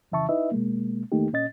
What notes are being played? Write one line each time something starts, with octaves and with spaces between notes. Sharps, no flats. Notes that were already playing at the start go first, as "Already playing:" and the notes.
F2 C#3 E3 E5 A5 C#6
D#4 E4 B4 D#5 E5
B2 G#3 A#3
E2 D#3 A3 A#3 D#4 G4
A#2 C#4 D#5 A6